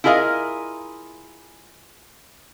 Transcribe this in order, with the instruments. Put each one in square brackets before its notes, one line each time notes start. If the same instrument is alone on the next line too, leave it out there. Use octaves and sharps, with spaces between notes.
[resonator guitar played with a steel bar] E4 F4 G#4 A#4 D#5 F5